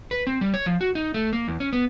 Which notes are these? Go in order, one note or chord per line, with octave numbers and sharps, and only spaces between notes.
B4
C4
G3
C#5
F3
F#4
D#4
A3
A#3
E2
C#4
B3